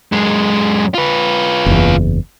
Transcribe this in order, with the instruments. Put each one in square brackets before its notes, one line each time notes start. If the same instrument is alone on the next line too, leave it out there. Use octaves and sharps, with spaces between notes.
[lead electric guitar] F#2 G#3
F4 B4
[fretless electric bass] F#1 E2